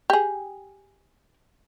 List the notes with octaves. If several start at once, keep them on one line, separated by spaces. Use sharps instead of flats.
G4 G#4